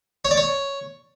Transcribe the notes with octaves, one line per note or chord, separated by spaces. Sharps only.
C#5
D5
C#5